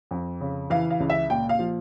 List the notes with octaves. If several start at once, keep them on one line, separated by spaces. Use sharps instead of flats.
F2
C#3
E3 F5
F5
C#2
E5
A#2 G5
F5
F3